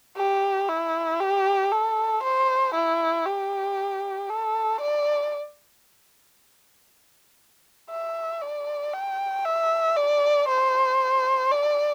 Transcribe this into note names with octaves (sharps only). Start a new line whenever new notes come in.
G4
E4
G4
A4
C5
E4
G4
A4
D5
E5
D5
G5
E5
D5
C5
D5